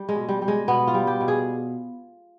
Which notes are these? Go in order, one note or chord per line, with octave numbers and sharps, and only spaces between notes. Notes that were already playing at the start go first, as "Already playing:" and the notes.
Already playing: G3
G#3
B2
G3
G3
G#3
B2 B3
F4
G3
G4
B2
G#4